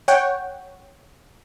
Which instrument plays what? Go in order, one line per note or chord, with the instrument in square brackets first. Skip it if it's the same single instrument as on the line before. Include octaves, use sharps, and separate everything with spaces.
[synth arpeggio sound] C#5 F#5 G5